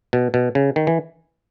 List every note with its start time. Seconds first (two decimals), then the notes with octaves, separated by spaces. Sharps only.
0.13 B2
0.34 B2
0.55 C#3
0.76 D#3
0.87 E3